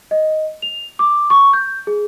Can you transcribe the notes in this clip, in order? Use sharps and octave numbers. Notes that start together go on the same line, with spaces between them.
D#5
F7
D6
C#6
G6
G#4